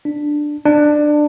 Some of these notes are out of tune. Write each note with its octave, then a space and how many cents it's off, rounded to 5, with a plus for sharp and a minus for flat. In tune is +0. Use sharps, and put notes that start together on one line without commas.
D4 +10
D4 +20